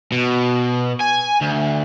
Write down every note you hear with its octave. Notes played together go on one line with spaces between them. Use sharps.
B2
G#5
D2